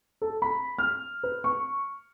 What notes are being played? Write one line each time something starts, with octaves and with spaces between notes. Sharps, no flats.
A4
B5
F6
B4
C#6